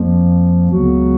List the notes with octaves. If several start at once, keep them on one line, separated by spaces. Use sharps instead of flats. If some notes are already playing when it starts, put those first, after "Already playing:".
Already playing: F2 F3 A#3
C#2 C#3 F#3 B3 F#4